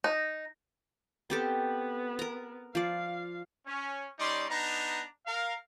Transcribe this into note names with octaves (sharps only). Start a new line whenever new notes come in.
D#4
B3 C4 G4 A4
A#4 A#5
F3 D5 F5
C#4
G3 C#4 D#4 D5 C6
B3 D4 D#4 A#5
A#4 F5